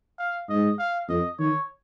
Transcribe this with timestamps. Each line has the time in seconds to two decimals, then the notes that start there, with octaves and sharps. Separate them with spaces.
0.19 F5
0.49 G#2 D#5
0.79 F5
1.09 F2 D#5
1.39 D#3 C#5